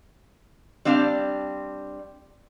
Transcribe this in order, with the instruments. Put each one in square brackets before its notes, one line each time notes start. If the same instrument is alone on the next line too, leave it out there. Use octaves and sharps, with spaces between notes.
[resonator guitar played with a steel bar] G3 C4 D4 F5